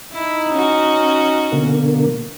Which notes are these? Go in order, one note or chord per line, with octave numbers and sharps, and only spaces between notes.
D#4 E4
C#4 F#4
B2 D3 A#3